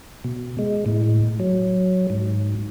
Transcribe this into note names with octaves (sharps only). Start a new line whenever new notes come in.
B2
G#3
A2
F#3
G#2